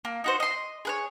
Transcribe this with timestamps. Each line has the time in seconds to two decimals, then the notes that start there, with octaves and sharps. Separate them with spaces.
0.05 A#3
0.24 D#4 F#4 C5
0.40 D#5 C6
0.85 G#4 B4 C#5